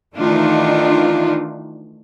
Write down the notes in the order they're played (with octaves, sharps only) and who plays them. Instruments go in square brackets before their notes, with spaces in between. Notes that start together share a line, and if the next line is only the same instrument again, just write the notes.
[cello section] D#3 E3 A3 D4 D#4 F4